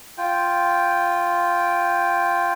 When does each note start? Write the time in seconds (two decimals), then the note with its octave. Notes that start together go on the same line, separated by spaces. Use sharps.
0.18 F4 G5